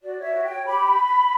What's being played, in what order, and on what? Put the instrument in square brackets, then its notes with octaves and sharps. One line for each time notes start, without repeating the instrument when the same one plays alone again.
[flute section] F#4 D5
C#5
E5
F#4
C#5 G5
G4 B5